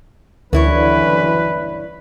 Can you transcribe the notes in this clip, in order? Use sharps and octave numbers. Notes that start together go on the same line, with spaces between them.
F#1 D2 G2 D3 E3 E4 B4 C#5